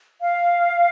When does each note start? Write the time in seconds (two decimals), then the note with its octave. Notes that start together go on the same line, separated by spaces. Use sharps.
0.21 F5